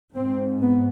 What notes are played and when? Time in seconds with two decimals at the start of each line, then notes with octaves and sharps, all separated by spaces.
0.16 G#2 C4
0.61 B3